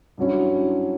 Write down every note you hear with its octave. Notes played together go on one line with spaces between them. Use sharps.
G2 F#3 C#4 E4